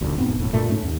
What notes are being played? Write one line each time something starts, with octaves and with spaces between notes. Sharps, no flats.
E1 D2
E1 G#2 B3 C4
E1 A2
G2 A#2 A3
G#2 A3 C#4
D#2